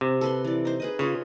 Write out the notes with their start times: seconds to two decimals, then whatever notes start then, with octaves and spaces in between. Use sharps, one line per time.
0.01 C3
0.21 A4 B4 C6
0.45 E3 D5
0.65 D#4 C5
0.80 G#4 B4 D#5
0.99 C#3 F4 C#5